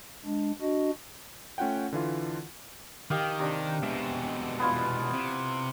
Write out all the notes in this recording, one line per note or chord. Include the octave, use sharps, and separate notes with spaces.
G#3 D4
D4 F#4 D#5
A3 C#4 F4 F#5 G5
D3 E3 F4
D#3 G4 D#5 F5
C3 D4
B2 G#3 E5
B3 E4 F4
C3